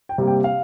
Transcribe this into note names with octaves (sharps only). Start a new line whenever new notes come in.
G5
C3 G3 A#3
G5
F5